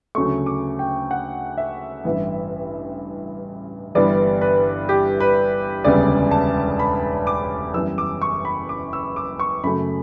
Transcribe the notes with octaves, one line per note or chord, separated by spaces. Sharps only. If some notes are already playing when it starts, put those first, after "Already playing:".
D2 C#3 F#3 A3 C#6
D6
G5
F#5
E5
A1 G2 E3
G1 G2 E3 G3 B3 D5
B4
G4
B4
E1 D2 C#3 G3 B3 D5
A5
B5
D6
F#2 E3 G3 B3 E6
D6
C#6
B5
D6
E6
D6
C#6
F#2 C#3 F#3 A3 B5